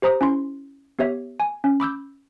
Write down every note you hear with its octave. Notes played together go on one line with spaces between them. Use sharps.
G4 C5 A#5 D#6
C#4 E4 C6
B3 G4 C#5 E5
G#5
C#4
B5 D6 E6 G6